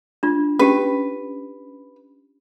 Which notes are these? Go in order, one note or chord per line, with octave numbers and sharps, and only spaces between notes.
D4 F4
C#4 G4 B4